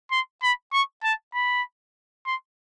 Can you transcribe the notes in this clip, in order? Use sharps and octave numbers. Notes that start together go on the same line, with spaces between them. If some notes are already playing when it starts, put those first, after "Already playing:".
C6
B5
C#6
A5
B5
C6